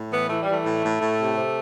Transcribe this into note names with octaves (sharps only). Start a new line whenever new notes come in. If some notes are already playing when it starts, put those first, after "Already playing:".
Already playing: A2
E3 B3
E3 A3
G3
E3
A3
A2
A2
A2
C3
C3